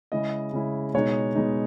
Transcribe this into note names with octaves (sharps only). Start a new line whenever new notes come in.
C#3 G#3 C#4 E4 D#5
C#3 G#3 C#4 E4
B2 G#3 D#4 C#5
B2 G#3 D#4